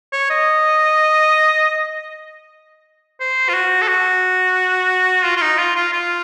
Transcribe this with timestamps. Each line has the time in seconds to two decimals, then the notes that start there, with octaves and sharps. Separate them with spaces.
0.13 C#5
0.30 D#5
3.20 C5
3.49 F4
3.54 F#4
3.82 A4
3.88 F#4
5.25 F4
5.37 F4
5.42 D#4
5.58 F4
5.76 F4
5.93 F4